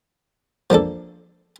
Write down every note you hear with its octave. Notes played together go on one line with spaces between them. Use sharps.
F3 A#3 D4 A4